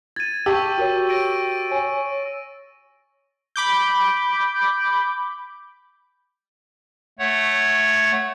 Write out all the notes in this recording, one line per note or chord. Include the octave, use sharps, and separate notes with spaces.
G#6 A6 D#7
G4 A5 C#6 E6
F#4 A#4 C#5
A#6 D7 D#7
C#5 G#5
B5 D6 G6
A3 C#5 F#5